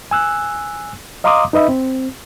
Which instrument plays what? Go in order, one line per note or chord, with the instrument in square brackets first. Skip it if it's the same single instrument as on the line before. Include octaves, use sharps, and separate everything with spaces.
[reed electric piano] G#5 E6 F#6
D#5 F5 A#5 C6 D6 D#6
D#4 B4 D#5 E5 B5
C4